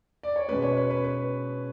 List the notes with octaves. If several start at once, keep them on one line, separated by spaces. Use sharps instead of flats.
D5
C#5
B2 G#3 C#4 B4
C#5
B4
B4
B4